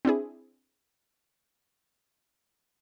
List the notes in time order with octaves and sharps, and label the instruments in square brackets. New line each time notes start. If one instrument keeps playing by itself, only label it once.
[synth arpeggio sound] C4 D4 E4 G#4